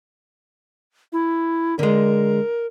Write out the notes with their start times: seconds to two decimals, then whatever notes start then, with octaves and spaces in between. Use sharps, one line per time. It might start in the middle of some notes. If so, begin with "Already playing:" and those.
1.13 E4
1.79 D3 G#3 A#4